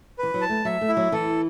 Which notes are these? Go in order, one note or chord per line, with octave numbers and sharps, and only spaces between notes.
E3 B4
F#3
A5
A3
F#3 E5
A3
E4
F#3
E3 A4